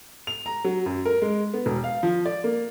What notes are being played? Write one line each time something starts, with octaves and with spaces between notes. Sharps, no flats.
F7
A#5
F#3
F#2
A#4
G#3
B3
E1
F5
F3
D5
A#3